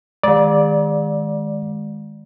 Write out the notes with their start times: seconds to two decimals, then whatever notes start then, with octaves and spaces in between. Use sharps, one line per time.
0.23 D#3 G#3 D5